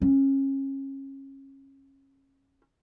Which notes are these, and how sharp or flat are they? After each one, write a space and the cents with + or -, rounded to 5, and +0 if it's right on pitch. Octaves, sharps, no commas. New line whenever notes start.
C#4 -30